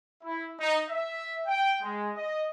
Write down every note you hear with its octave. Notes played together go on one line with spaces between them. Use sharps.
E4
D#4
E5
G5
G#3
D#5